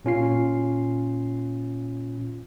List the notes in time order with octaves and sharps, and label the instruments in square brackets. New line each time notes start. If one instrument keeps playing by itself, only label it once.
[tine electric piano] A#2 C#4 F4 C7